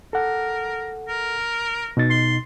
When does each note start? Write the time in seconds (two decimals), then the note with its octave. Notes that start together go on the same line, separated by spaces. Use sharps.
0.13 A4 A#4 F#5
1.08 A#4
1.97 B2 D#4 A6
2.10 C6